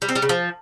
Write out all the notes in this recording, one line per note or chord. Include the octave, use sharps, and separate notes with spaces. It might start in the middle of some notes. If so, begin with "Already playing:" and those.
G3
C4
G3
C#3
F3